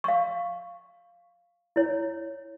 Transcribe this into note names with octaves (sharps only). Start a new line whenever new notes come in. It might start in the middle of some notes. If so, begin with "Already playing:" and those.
F5 C#6
E4 C#5